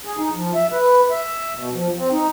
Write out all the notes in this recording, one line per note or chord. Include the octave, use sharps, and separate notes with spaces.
G#4
D#4
F3
E5
B4
E5
B2
F3
C4
D#4